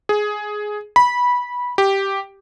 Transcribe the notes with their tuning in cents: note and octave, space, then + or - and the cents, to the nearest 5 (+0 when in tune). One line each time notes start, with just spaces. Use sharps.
G#4 +10
B5 -15
G4 -5